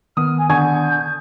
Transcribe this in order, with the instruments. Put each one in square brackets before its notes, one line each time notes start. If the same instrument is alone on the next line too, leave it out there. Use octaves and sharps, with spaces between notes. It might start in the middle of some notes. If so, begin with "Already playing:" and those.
[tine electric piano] D#3 B3 [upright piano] D#6 [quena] F6
[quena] G#5
[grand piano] D3 [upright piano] G#5 C#6 G#6 [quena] G6